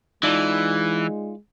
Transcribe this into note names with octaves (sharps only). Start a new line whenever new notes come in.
E3 G#3 D#4 F4 D5